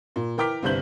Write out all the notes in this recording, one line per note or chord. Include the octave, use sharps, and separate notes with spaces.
A#2
E3 A#4 G5 D6 F6 B6
G1 C2 G2 C5 G6 F#7